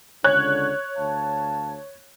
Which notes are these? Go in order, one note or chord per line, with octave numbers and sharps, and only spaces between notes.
C#2 D3 C#5 F#6 G#6
D2 F5 A5